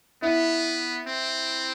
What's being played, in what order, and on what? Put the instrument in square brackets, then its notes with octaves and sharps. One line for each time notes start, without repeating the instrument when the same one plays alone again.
[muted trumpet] B3 [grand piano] E4
[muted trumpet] C4